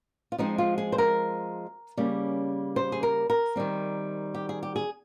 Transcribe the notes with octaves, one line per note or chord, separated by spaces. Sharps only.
F4
F3 G#3 C4 D#4
F4
G#4
C5
A#4
C#3 G3 A#3 C#4
C5
G#4
A#4
A#4
D#3 G3 C4
G4
G#4
G4
G#4